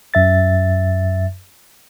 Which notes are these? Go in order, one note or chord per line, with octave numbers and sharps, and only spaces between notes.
F#2 E5 A6